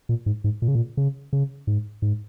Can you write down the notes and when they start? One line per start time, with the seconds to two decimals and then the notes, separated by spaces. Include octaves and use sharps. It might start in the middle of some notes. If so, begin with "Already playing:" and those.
0.09 A#2
0.26 G#2
0.44 G#2
0.62 A#2
0.68 C#3
0.75 A#2
0.97 C#3
1.33 C#3
1.67 G#2
2.02 G#2